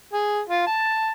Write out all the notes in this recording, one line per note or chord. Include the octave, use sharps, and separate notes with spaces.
G#4
F4
A5